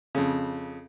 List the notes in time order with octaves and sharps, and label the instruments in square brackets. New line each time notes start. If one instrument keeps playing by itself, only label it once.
[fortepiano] F2 C#3